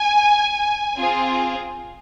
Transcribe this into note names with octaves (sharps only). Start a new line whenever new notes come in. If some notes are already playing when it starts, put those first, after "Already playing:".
Already playing: G#5
C4 F4 G#4